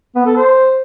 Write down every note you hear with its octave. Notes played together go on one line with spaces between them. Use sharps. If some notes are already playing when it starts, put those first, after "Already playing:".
B3
A4
C5